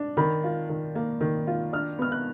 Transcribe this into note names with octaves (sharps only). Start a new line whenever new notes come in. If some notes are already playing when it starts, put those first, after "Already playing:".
Already playing: D4
D#3 B5
F4
D#3
A#3
D#3
F4
D4 F6
B3 F6
F#6